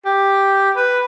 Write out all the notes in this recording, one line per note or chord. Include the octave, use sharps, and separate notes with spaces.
G4
B4